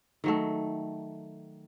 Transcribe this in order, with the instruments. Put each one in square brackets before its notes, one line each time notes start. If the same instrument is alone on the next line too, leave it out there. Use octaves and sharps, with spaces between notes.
[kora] D#3 F#3 A3